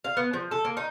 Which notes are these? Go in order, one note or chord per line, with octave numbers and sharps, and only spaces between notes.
F5
B3
F3
A4
A#3
D#4